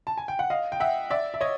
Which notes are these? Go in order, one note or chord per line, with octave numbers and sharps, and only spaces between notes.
A5
G#5
G5
F#5
D#5 F5
G5
E5 F#5
D5 E5
E5
C#5 D#5